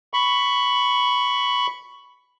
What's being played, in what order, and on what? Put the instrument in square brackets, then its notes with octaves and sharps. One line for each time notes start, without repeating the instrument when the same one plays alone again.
[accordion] B5 C#6